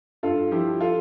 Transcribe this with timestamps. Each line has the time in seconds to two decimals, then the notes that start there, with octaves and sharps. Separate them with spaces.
0.23 G2 F4 A4
0.51 F3 E4 G4
0.81 F4 A4